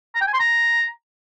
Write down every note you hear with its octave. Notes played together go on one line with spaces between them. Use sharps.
A#5
G5
G#5
C6
A#5